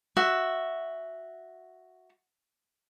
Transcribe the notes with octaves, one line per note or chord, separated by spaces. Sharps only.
F#4 E5